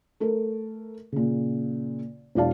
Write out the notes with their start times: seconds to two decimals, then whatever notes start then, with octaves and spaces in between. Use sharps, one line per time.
0.20 A3 A4 A#4
1.12 A#2 C#3
2.35 E1 E4 F#4 D5 F5 A5